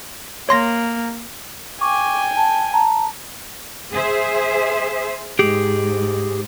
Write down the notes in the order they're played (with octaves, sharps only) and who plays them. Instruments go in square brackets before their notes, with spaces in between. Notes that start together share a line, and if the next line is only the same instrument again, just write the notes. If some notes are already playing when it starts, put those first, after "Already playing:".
[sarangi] A#3 [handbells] C#5 C6 A#6
[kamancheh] G5 G#5 [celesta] C#6 D6
[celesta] A5
A5 A#5
[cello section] G#4 C5 E5
[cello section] G#2 [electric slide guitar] G4 G#4